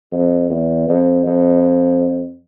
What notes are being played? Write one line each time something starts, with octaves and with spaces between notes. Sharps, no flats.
F2
E2
F2
F2